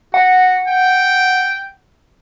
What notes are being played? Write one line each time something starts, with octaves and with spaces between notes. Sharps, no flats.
F#4 F#5
G5